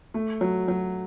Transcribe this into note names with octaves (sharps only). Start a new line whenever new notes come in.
A3
F#3
F#3